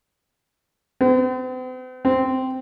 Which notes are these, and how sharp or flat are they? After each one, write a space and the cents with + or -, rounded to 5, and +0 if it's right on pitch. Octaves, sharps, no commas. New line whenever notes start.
C4 -45
C4 -10